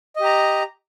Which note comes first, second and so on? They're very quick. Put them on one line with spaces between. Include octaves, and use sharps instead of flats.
D#5 G4 A#5